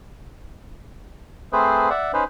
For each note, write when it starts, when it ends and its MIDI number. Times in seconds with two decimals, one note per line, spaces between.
1.53 1.89 57
1.53 1.89 60
1.53 1.89 68
1.53 1.89 71
1.53 1.89 72
1.90 2.12 74
1.90 2.12 76
1.90 2.12 78
2.13 2.24 61
2.13 2.24 63
2.13 2.24 71
2.13 2.24 72